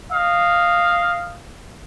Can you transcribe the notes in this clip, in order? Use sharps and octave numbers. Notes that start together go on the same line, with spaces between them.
D#5 F5